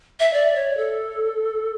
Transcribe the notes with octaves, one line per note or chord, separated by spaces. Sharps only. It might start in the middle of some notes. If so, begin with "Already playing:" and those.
E5
D5
C#5
A4